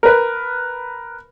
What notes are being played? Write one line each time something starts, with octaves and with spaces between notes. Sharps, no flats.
A#4 B4